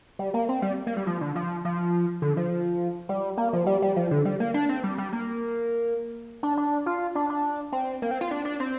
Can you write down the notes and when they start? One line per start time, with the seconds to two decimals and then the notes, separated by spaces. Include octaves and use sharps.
0.19 G3
0.34 A#3
0.49 C4
0.62 G3
0.87 A#3
0.97 G3
1.07 F3
1.21 D3
1.35 F3
1.65 F3
2.22 D3
2.37 F3
3.09 G3
3.38 A#3
3.53 F3
3.66 G3
3.82 G3
3.96 F3
4.11 D3
4.25 G3
4.40 A#3
4.54 D4
4.69 C4
4.84 G3
4.98 G3
5.13 A#3
6.43 D4
6.57 D4
6.86 F4
7.15 D4
7.30 D4
7.72 C4
8.02 A#3
8.11 C4
8.21 F4
8.31 D4
8.45 D4
8.60 C4